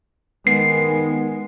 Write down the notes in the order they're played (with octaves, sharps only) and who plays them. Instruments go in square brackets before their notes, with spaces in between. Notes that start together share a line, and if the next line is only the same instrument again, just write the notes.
[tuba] D#3 [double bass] G#3 [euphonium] B3 [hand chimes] C7